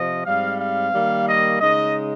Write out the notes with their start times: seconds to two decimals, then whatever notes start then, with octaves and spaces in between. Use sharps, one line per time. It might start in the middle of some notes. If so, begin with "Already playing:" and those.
Already playing: C3 F3 D#5
0.26 G#2 G3 C4 F5
0.59 F5
0.94 D#3 G3 A#3
1.27 D#5
1.61 C#3 G#3 D#4 D#5